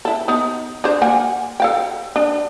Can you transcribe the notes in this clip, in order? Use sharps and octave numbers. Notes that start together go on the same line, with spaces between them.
E4 A4
B3 D#4
D4 G#4 C5
A#3 F#5 G#5
A4 F5 G5
D4